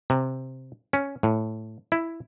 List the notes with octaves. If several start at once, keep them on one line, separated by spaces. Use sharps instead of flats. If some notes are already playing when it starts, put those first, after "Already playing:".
C3
C#4
A2
E4